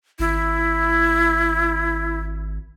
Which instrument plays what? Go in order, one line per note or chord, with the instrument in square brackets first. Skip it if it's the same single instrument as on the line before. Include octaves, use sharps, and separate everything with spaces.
[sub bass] G#1 [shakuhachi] E4